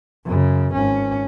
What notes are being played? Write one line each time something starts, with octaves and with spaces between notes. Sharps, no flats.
F#2 C#3
G#1 C#4